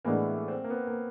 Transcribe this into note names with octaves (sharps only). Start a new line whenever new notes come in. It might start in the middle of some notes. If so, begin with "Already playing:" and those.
A2 E3 G#3 A#3 B3 D4
C4
A#3
B3
A#3